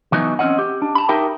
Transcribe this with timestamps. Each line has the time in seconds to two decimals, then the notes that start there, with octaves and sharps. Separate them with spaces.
0.12 E3 F#3 B3 D#4
0.39 C4 C#4 D#5 F#5
0.59 G4
0.82 D4
0.95 A5 B5
1.09 D#4 G4 A#4 E5 G5